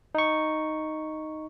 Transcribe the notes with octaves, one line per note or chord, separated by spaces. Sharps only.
D#4 C#6